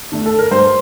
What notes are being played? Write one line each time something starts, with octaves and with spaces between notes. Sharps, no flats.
D3 A3 D4
A4
A#4
G2 C5